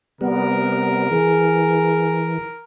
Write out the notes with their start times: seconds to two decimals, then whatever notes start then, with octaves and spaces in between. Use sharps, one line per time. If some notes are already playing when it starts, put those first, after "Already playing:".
0.21 C3 G3 B3 A#4
1.11 E3 G#4